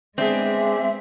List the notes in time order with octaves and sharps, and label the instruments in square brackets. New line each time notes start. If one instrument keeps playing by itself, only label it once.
[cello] G#3 B3 [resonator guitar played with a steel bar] C4 [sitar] D4 G#4 [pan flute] E5